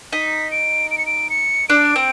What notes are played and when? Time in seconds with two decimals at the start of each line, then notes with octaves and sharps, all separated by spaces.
0.13 D#4 B6
0.51 D7
0.91 D7
0.98 C#7
1.06 D7
1.30 C#7
1.69 D4 D7
1.96 C4